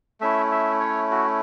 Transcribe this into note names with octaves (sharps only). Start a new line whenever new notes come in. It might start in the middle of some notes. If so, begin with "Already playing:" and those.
A3 C#4 E4 E5
E5
C#5
F#4